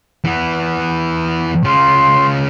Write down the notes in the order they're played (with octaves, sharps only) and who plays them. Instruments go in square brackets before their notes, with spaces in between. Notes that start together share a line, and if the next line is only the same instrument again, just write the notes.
[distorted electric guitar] E3 B3
[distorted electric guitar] C#3 F4 [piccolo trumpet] C6